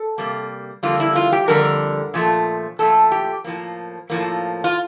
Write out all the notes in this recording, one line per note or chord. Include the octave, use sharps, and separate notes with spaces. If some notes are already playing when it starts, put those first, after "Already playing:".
Already playing: A4
C3 G3 A#3
F2 D3 G3 A#3 F4
E4
F4
G4
F2 D3 G3 A#4
A#2 F3 A3
A#2 F3 A3 A4
G4
A2 F3 A#3
A2 F3 A#3
F4